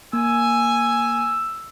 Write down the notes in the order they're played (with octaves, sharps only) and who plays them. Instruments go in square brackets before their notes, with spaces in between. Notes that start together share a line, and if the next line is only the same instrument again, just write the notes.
[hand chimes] A#3 [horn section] G#5 [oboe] E6